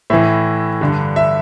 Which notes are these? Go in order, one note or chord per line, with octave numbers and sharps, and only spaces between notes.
A2 E3 E5
G2 D3
E5